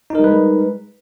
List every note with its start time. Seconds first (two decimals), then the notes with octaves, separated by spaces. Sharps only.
0.10 D#4
0.15 A#4
0.19 G3
0.24 B4
0.29 G#3